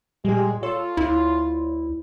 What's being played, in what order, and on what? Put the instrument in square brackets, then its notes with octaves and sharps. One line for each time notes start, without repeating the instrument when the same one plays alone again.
[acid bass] A#2 [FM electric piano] G3 G4 [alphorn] G#3
[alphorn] F4 [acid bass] A4 [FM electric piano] C#5 C6
[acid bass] D2 [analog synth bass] E4